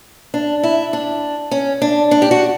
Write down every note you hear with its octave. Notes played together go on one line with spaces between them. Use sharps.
D4
E4
D4
C#4
D4
D4
G4
F#4